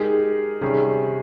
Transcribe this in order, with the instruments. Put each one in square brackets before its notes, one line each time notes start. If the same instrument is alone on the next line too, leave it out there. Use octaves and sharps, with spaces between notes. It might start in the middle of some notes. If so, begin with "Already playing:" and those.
Already playing: [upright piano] G#3 D#4 G4 A#4 [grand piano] G#4
[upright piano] C3 D#3 G3 C#4 [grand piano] G#4